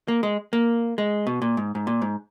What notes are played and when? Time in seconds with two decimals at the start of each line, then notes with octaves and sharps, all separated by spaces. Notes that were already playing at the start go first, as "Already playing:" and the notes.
0.08 A#3
0.23 G#3
0.53 A#3
0.98 G#3
1.27 B2
1.42 A#2
1.57 G#2
1.75 G#2
1.87 A#2
2.02 G#2